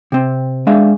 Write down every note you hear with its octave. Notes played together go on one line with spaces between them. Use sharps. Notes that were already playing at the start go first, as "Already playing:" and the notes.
C3 C4
G#3 D4 E5 F5